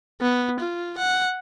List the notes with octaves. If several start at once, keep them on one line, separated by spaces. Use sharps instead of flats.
B3
F4
F#5